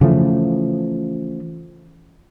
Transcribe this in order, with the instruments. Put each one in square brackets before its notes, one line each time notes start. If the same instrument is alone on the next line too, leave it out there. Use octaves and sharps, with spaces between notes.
[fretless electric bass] C#3 E3 F3 A3